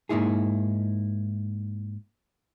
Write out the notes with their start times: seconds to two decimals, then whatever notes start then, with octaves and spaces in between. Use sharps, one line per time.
0.09 G#2 A#3 D#4 E4 G#4